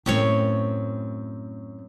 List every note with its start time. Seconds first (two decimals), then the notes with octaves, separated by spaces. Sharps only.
0.06 F#2 A2 A3 C4 C#5